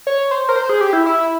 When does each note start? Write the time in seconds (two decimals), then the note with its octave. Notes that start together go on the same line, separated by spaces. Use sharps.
0.07 C#5
0.31 C5
0.49 A#4
0.56 C5
0.69 G#4
0.81 G4
0.93 E4
1.06 E4